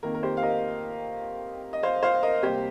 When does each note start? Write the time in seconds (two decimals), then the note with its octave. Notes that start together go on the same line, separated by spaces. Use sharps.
0.03 F2 D#3 A#3 A#4
0.14 A#4
0.23 G4 C5
0.37 F5
0.43 A#4 D#5
1.73 D#5
1.83 C5 F5
2.03 C5 F5
2.23 A#4 D#5
2.43 C3 G3 A#3 G4 C5